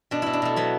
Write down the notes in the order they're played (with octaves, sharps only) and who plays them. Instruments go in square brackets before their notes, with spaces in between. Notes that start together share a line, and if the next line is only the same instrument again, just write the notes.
[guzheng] B2 D4
B2 E4
D4
B2 A3
F#3 B3